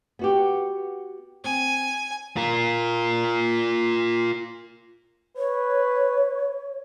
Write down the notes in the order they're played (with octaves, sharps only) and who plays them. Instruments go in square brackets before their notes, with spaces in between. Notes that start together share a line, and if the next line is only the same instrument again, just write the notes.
[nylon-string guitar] B3 F#4 G4
[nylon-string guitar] C4 [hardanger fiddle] G#5
[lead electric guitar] F4 A#4
[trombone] B4 [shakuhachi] C#5